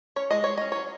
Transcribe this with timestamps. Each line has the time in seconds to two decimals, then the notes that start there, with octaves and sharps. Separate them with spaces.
0.16 C#4 C#5
0.31 G#3 D#5
0.44 G#3 C#5
0.57 C#4 D#5
0.72 F#3 C#5